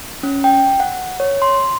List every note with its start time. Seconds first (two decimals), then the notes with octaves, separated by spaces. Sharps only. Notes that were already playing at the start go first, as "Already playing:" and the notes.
0.23 C#4
0.44 G5
0.80 F#5
1.20 C#5
1.42 C6